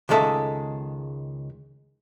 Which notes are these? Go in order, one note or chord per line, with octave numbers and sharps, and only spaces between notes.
C#2 D#3 G#3 A4 E5